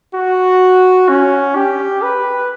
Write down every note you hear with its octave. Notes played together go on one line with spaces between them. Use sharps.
F#4
C#4
G4
B4